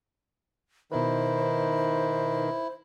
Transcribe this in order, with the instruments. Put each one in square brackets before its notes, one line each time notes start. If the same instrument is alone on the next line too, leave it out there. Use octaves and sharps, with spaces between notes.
[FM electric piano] B2 D#4 B4 [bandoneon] D#3 [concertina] E4 [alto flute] C5